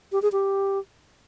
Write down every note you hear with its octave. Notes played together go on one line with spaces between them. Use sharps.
G4
G#4
G4